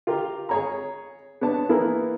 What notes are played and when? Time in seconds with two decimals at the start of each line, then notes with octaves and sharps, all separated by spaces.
0.07 F4 G4 A#4
0.49 G#4 C#5 A#5
1.41 B3 D4 C#5 A5
1.69 E3 A#3 B3 E4 G#4 A#4